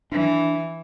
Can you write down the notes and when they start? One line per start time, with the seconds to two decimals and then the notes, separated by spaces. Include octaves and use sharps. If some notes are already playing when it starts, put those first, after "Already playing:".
0.12 E3 D4